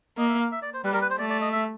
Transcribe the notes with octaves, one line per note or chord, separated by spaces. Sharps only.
A#3 D#5
E5
F5
E5
D5
C5
G3 B4
A#4
B4
C5
A3 D5
D5
D#5
E5